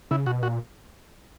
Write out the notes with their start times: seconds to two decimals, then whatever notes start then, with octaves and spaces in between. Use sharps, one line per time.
0.11 C#3 E4
0.26 B2 F#4
0.42 A#2 F#4